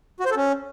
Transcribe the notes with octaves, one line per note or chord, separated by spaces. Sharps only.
F#4
C5
A4
C#4